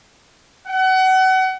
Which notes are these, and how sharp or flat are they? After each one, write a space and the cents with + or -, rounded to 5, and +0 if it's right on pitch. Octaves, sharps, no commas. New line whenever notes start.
F#5 +30